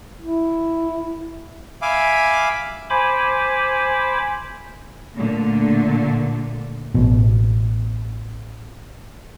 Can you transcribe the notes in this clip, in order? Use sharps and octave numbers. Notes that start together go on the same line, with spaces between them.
E4
E5 F5 G#5 B5 D6
C5 G#5 B5 D6
A#2 D3 A3
A1 B2